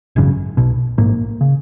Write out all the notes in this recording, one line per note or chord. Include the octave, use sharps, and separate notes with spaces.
G#1 F#2 C#3
B1 B2
A#1 G#2 A#3
C#3